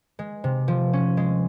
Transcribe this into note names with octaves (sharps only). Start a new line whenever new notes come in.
G#3
C3
F3
C#4
G#3